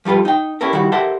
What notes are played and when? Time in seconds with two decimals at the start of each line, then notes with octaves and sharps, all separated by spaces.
0.05 F3 G3 F4 A4 B4
0.25 D#4 G5
0.61 C#4 E4 G4 A4 A#4
0.73 D#3 G3 E4 F#4
0.92 G4 A4 A#4 C5 E5 F#5